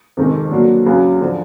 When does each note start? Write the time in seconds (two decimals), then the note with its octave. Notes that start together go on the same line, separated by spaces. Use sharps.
0.17 F2 C3 D#3 G#3 C4
0.51 D3 F#3 A#3
0.86 E2 C#3 F#3 B3
1.21 D3 F3